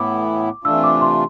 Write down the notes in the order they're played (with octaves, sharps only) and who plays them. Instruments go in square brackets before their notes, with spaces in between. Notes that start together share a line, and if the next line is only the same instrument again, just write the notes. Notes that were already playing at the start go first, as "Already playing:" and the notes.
Already playing: [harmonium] A2 E3 B3 E4 [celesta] D6
[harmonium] C3 E3 A3 D4 F4 [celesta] E6
[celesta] D6
C6